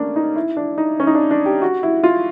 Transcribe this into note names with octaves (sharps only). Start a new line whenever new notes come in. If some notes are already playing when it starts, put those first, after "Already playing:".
Already playing: A3 A#3 C#4 D4
D#4
E4
D4
D#4
C#4
D#4
D4
D4
G4
F#4
E4
F4